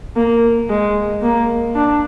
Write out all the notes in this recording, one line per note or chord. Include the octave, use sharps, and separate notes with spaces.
A#3
G#3
A#3
D4